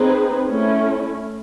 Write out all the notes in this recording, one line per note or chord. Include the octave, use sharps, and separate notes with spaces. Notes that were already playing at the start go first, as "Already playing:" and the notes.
Already playing: C4 D#4 G#4 B4
A3 C#4 E4